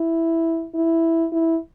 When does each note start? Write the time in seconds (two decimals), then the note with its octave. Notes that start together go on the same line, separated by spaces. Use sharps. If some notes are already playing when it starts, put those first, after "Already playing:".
Already playing: E4
0.75 E4
1.32 E4